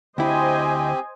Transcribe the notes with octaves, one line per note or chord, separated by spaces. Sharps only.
D2 C4 E4 G4 C5 D#5 G#5